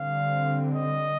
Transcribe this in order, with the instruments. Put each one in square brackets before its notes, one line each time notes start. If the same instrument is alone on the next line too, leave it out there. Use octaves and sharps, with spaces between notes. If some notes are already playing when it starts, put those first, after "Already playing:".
Already playing: [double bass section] D3 G3 C4 [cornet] F5
[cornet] D#5